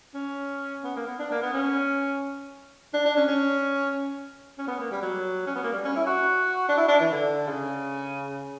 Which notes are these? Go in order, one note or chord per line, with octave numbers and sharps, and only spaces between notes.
C#4
B3
A#3
B3
D4
A#3
B3
C#4
D4
D4
C#4
C#4
C#4
B3
A#3
G3
F#3
C#4
B3
A#3
G3
C#4
E4
F#4
D4
E4
D4
E3
D3
C#3